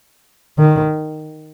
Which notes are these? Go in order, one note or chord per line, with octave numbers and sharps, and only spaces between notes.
D#3